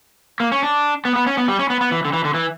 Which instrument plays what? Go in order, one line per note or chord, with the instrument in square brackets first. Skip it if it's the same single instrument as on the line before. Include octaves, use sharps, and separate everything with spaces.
[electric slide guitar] A#3
C#4
D4
B3
B3
C#4
B3
G3
C#4
B3
B3
E3
D3
E3
D3
E3